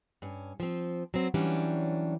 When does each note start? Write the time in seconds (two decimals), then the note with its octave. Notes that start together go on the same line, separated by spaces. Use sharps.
0.22 G2 C#4
0.60 F3 C4
1.14 F#3 B3 C4
1.34 E3 F#3 G3 C#4 D4